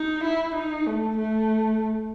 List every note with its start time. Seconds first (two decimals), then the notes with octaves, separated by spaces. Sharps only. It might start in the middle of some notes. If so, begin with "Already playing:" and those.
Already playing: D#4
0.24 E4
0.55 D#4
0.87 A3
1.17 A3